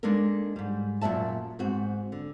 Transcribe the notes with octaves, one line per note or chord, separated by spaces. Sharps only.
G#3 A#3 D4 D#4 A4 A#4
G#2 G3
F#2 A#2 D5 E5 A5
G#2 C4 F#4
D3